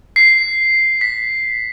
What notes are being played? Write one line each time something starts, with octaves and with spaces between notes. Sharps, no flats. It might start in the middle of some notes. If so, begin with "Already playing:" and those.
C7
B6